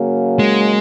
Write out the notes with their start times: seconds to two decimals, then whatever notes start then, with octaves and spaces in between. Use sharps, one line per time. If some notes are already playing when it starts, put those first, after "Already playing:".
Already playing: C#3 F#3 A#3
0.39 G#3